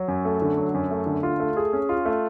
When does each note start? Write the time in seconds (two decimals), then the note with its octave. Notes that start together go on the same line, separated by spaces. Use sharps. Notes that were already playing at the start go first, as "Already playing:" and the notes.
Already playing: F#3
0.08 F#2
0.25 A3
0.42 D3
0.58 F#3
0.74 F#2
0.90 A3
1.06 D3
1.23 F4
1.40 A3
1.57 G#4
1.73 C#4
1.89 F4
2.05 A3